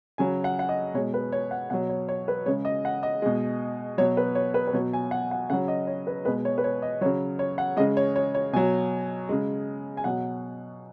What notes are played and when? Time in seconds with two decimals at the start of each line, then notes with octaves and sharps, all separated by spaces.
0.18 C#3 F#3 G#5
0.44 F#5
0.59 F#5
0.69 D#5
0.94 B2 G#3 C#5
1.14 B4
1.32 C#5
1.51 F#5
1.70 B2 F#3 F#5
1.89 C#5
2.09 C#5
2.28 B4
2.46 C#3 G#3 C#5
2.65 D#5
2.85 F#5
3.03 D#5
3.22 B2 G#3
3.98 B2 F#3 C#5
4.17 B4
4.35 C#5
4.54 B4
4.67 B4
4.73 B2 F#3 C#5
4.93 G#5
5.11 F#5
5.31 F#5
5.50 C#3 F#3 F#5
5.68 D#5
5.87 C#5
6.07 B4
6.25 B2 G#3 B4
6.45 C#5
6.58 B4
6.64 C#5
6.82 D#5
7.01 F#3 C#5
7.05 C#3
7.39 C#5
7.58 F#5
7.77 C#3 G#3 D#5
7.97 C#5
8.16 C#5
8.35 C#5
8.53 B2 F#3 G#5
9.29 C#3 G#3
9.97 G#5
10.04 B2 F#3 F#5